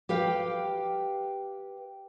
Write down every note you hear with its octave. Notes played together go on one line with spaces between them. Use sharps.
G4 B4 F5 G5